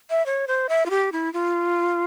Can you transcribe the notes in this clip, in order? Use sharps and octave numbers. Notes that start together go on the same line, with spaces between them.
E5
C#5
C5
E5
F4
G4
E4
F4